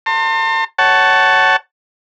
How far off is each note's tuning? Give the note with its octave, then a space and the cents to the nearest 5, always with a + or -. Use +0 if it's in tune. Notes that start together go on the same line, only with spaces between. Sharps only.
A5 +45 C6 +20
C#5 +0 F#5 +20 A5 +0